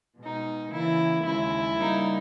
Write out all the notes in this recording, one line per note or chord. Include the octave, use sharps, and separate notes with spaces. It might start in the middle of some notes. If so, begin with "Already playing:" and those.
B2 G#3 D#4
C#3 E3 A#3 E4
D#2 C#3 G#3 E4
C#3 G3 A#3 D#4